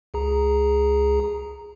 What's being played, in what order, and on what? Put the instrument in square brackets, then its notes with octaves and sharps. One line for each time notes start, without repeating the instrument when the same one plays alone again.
[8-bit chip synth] C#2 G#4 A#5